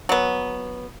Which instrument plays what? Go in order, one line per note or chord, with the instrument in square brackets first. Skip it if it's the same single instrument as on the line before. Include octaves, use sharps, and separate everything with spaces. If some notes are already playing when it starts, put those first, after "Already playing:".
[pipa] F#3 B3